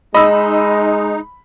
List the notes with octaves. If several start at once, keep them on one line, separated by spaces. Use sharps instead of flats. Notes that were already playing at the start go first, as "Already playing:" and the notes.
G#3 D#4 D#5 B5 E6